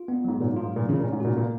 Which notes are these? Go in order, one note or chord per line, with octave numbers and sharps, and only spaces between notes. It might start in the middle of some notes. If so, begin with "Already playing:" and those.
Already playing: F4
B3
G#2 F#3
A#2 F#3
G#2
F4
G#2
A#2 F4
C#3 C#4
A#2
C#4
G#2
A#2 F#4
A#2 A#3